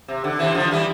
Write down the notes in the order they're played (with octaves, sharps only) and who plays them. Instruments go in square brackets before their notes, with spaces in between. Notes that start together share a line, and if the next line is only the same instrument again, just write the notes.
[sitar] C3
D3
C3 E3
D3 F3
E3 G3